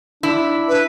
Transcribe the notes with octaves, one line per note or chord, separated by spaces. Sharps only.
D4 E4
B4